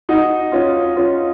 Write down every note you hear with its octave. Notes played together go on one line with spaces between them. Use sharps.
D#4 F#4
C#4 F4
C#4 F4